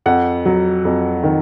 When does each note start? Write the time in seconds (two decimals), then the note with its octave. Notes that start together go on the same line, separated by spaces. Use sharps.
0.06 F2 F#5
0.46 F#3
0.85 F2
1.23 D#3